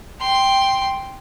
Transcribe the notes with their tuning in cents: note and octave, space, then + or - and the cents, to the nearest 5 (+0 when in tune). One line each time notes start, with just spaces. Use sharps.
G5 +0 C6 +0